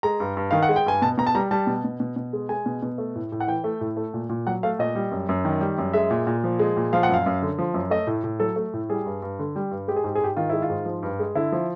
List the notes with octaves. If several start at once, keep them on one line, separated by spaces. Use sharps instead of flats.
G#3 A#5
G2
G2
D#3 F5
F#5
G#3
G5
G2 G#5
B2 A5
B2 A#5
A5
G3 A#5
G3 A5
B2
B2
B2
B2
G#3
G#3 G#5
B2
B2
A3
A2
A2
F#5
E3 G5
A3
A2
A3
A#2
A#2
F#3 F#5
A3 F5
A#2 D#5
G3
F#2
F#2
D#3
G3
F#2
G#3 E5
A#2
A#2
F3
G#3
A#2
F3 F5
F#5
F#2 F5
F#2
D3
F3
F#2
A3 D#5
A2
A2
F#3 A4
A3
A2
G3 G#4
G2
G2
D3
G3
G2
G#3 G4
G#4
G#2 G4
G#4
G#2 G4
D#3 F4
G#3 E4
F4
G#2
F3
G2
G#3
D3 E4
F3